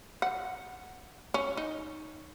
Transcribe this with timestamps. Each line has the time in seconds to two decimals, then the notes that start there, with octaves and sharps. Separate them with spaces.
0.22 F#5
1.34 C#4
1.57 D#4